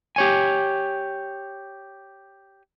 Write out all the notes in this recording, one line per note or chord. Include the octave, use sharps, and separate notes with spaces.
G4 C#5 G#5